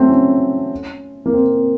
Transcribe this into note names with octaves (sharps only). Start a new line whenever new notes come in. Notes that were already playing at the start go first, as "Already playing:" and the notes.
Already playing: F#3 A3 C4
C#4
A#3
C4